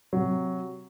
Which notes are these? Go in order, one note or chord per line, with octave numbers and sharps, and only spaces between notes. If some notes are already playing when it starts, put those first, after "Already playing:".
C3 F#3